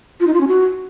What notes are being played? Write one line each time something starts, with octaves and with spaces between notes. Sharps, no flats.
F4
D#4
F4
C#4
F#4